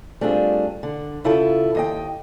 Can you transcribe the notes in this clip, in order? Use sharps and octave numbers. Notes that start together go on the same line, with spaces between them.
G3 A3 C4 D4 F4 G#4
D3
C#3 E4 F4 A4
D#2 D#5 G5